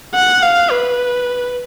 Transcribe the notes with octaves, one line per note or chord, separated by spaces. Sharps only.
F#5
F5
B4